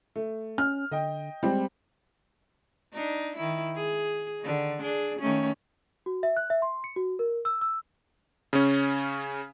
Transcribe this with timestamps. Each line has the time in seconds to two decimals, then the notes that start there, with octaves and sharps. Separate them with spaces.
0.16 A3
0.58 C#4 F6
0.92 D3 D#5 G5
1.43 G3 G#3 C4
2.93 D4 D#4
3.36 D#3 E4
3.75 G#4
4.41 D3 D#3
4.80 D4 G#4
5.19 D#3 A3 C#4
6.06 F#4
6.23 E5
6.37 F#6
6.50 E5
6.62 C6
6.84 C#7
6.96 F#4
7.19 A#4
7.45 E6
7.61 E6
8.53 C#3 C#4